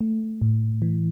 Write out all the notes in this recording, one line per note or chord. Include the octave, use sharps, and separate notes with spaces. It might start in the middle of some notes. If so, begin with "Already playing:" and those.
A3
A2
E3